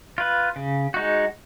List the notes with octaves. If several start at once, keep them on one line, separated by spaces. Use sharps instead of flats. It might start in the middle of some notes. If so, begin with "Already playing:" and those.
F4 B4
C#3
G#3 D#4 F#4